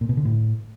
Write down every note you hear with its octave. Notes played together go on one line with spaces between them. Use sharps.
A#2
B2
D3
A2